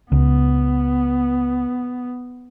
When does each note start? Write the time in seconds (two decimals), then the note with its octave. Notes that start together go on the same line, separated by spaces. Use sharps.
0.12 C#2 B3